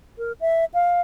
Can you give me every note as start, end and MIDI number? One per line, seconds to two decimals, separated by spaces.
0.18 0.32 70
0.41 0.65 76
0.74 1.01 77